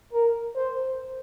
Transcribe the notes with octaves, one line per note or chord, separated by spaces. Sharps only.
A#4
C5